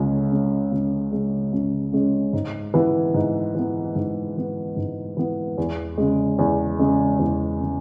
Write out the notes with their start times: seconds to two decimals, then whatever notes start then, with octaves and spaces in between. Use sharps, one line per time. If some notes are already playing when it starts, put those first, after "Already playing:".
Already playing: C#2 C#3 G#3 C#4
0.31 C#3 G#3 C#4
0.72 C#2
1.12 C#3 G#3 C#4
1.53 C#2
1.92 C#3 G#3 C#4
2.33 G#2
2.74 E3 B3
3.14 G#2
3.55 E3 B3
3.96 G#2
4.36 E3 B3
4.76 G#2
5.17 E3 B3
5.58 E2
5.98 C#3 G#3
6.39 E2
6.79 C#3 G#3
7.19 E2
7.60 C#3 G#3